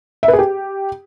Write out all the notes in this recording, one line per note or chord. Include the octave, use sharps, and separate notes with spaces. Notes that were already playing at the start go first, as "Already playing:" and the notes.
E5
B4
G#4
G4